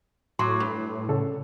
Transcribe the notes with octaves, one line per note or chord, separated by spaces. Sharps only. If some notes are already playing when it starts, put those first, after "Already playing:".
A2 F#3 C6 D6
G2
C#3 A4 C#5